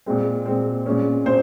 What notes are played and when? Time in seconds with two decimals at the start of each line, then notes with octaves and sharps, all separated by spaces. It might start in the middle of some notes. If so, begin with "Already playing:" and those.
0.06 A#2 G#3 C4
0.46 A#2 G#3 C4
0.86 A#2 G#3 C#4
1.25 A#2 C5